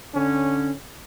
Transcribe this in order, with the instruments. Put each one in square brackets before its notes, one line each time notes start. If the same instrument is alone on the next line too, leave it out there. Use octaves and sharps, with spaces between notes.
[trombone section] D3 C#4